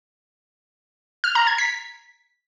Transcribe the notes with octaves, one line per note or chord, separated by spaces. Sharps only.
F6
A#5
G#6
B6